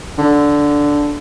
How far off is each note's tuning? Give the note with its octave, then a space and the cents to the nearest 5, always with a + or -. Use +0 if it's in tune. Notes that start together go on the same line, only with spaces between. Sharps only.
D3 -5